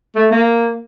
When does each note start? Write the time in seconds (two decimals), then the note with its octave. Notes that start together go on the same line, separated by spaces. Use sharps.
0.16 A3
0.31 A#3